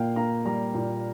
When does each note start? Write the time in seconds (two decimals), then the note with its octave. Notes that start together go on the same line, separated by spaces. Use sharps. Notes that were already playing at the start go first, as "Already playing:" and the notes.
Already playing: A#2 A#3 F5 G5
0.16 A#3 A#5
0.45 G3 A#5
0.74 A#2